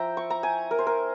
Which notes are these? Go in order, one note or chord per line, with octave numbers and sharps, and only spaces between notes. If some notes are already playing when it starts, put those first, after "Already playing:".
Already playing: F3 C4 E4 E5 G5 A#5
C#6
A#5
G#5
A#4
C5
A#4